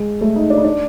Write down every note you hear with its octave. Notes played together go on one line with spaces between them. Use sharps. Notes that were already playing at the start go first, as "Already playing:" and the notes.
Already playing: G#3
A3
D#4
D4
D#4
D4